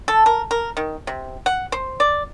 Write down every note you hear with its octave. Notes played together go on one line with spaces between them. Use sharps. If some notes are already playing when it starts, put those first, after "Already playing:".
A4
A#4
A#4
D#3
C3
F#5
C5
D5